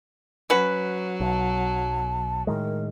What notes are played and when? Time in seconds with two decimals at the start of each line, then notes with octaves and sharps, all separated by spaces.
0.50 F#3 C#4 F#4 B4
1.20 B1 A5
2.47 A2 D#3 G#3 A#4